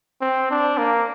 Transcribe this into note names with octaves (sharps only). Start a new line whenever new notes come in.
C4
D4
A#3